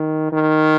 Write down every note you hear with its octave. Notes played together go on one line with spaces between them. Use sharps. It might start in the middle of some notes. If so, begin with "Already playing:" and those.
Already playing: D#3
D#3